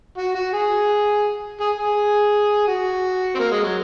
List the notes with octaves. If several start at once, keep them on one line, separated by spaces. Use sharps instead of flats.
F#4
F#4
G#4
G#4
G#4
F#4
C4
A#3
G#3
F#3